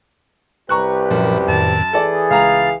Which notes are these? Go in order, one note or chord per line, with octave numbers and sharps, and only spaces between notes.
C2 G4 B4 A#5 C#6 F#6
F#2 A#2 F3 A#4
F2 A2 D#3 A5
E3 G#4 A4 D5 A6
C#2 F5 A#5 F7